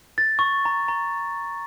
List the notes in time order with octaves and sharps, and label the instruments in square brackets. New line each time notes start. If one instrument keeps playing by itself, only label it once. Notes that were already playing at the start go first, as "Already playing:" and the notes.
[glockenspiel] A6
C#6
A#5
A#5